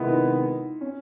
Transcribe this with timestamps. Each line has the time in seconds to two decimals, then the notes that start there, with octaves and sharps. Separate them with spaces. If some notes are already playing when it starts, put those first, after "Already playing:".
Already playing: C3 D#3 G#3 B3 E4 F4
0.09 D#4
0.81 C#4